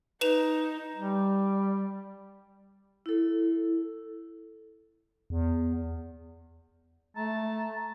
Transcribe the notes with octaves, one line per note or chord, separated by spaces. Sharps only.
D#4 B4 E7 F7
G3
E4 A4
E2
A3 A5 A#5